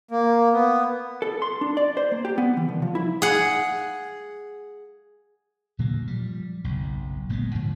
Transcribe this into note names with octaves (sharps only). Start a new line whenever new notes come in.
A#3
B3
A4
C6
D4
D5
C5
A#3
G4
B3
E3
C2
F3
E4
G#4 F#5
A#2 D3 F#3 A#3
F3 G3
F#1 B1
G1 A#2 G#3 B3
G#2 D3 F3